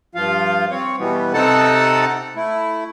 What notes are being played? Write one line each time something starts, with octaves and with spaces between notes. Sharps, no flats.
G2 F3 F4 F5
C4 C#5
B2 E3 G3 B3
C3 C4 D#4 A4 F#5 A5
A3 E4